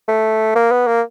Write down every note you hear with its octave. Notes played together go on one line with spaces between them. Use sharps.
A3
A#3
B3
A#3